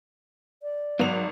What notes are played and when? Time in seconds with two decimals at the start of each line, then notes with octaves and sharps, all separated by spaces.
0.63 D5
0.99 G#1 F#3 B3 F7